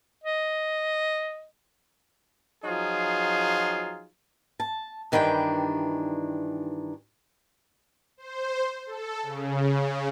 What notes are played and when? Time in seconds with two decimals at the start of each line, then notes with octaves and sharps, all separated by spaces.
0.23 D#5
2.64 F3 F#3 D#4 F4 G#4
4.60 A5
5.12 G2 D#3 E3 D4 G5
8.17 C5
8.86 A4
9.23 C#3